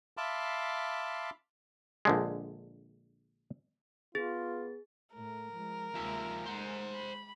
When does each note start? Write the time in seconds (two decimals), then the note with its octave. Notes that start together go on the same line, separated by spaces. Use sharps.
0.17 E5 F5 A5 B5 C6 D6
2.05 A#1 D3 G#3
4.15 B3 F4 G#4 A6
5.14 A2 A3 A#4
5.52 F3 G#3
5.95 D#2 F3 G#3 E5
6.46 G#3 C5 F#5
6.93 B5